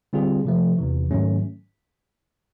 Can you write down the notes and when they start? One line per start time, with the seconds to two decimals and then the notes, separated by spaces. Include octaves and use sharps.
0.13 D3 G3 C4 F4 G#4
0.45 C3 F3 A3
0.78 E2 C3 E3
1.11 G#2 D#3 F#3 A3 C#4